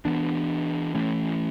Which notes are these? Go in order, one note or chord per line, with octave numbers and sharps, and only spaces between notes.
E3 B3 D4
E3 A3 C#4